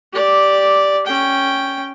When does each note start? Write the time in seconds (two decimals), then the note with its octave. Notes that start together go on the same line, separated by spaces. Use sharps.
0.13 G4 D5
1.07 C#4 G5